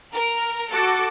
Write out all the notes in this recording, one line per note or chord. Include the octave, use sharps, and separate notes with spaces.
A#4
F#4 A4 D6